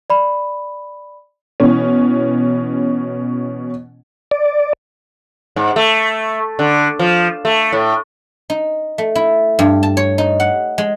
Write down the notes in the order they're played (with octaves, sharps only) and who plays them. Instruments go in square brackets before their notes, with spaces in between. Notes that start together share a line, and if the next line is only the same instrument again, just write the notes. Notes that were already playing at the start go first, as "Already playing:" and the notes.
[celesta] D5 B5
[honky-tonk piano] B2 E3 C#4
[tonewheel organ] D5
[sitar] G#2
A3
D3
F3
A3
A2
[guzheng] D#4
A3
E4
G2
A5
C#5
D#4
F#5
G#3